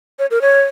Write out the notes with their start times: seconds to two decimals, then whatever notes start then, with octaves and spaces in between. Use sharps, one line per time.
0.19 C#5
0.31 A#4
0.42 C#5